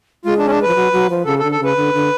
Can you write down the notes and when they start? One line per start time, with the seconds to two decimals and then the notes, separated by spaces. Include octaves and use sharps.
0.25 G#3 F4
0.38 D4
0.46 C#4
0.50 D4
0.62 B4
0.68 F3
0.75 F#3
0.92 F#3
1.10 F3
1.26 C#3 A4
1.39 A4
1.44 D3
1.52 A4
1.60 C#3 B4
1.77 D3
1.94 D3